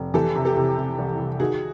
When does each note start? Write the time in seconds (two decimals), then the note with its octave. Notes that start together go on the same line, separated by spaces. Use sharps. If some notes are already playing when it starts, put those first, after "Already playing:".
Already playing: F1
0.14 E3 G4 A4
0.36 C3
0.45 G4 A4
0.57 C3
0.78 C3
0.98 C2
1.19 C3
1.40 D#3 F#4 G#4